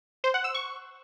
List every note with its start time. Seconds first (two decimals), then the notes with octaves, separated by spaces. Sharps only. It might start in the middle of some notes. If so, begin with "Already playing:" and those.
0.24 C5
0.34 F#5
0.44 E6
0.54 C#6